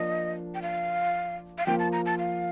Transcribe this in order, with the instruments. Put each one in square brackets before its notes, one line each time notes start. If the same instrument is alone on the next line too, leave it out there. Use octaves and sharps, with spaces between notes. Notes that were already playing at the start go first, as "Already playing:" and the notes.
Already playing: [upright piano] F3 A#3 D4 [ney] D#5
[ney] G5
F5
F5
[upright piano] F3 A#3 F4 [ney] G5
[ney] A5
A#5
A5
F5